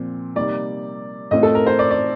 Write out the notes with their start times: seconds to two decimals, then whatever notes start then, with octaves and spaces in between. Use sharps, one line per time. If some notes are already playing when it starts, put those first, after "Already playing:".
Already playing: A#2 F3 C4
0.36 C3 G3 A#3 D#4 D5
1.31 A2 A3 C4 F4 D#5
1.43 A4
1.55 A#4
1.66 C5
1.79 D5
1.90 D5